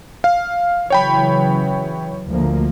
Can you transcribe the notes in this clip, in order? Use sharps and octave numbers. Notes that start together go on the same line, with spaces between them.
F5
C#3 E3 F#3 C#5 G5 B5
D2 F3 A#3